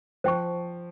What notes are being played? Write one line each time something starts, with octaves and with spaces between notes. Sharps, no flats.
F3 C5 G5 C#6